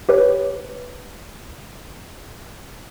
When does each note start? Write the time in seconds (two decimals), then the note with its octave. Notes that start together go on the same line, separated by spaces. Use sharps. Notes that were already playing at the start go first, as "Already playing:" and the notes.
0.09 G4 B4 C#5